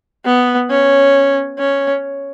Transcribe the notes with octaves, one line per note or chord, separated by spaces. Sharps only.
B3
C#4
C#4